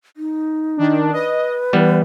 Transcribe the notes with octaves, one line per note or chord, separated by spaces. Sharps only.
D#4
D#3 D4
B4 D#5
E3 G3 B3